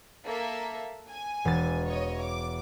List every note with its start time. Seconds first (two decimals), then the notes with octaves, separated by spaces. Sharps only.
0.25 A#3 A4 E5
1.09 G#5
1.45 E1 A6
1.85 C#5 D#5
2.21 D6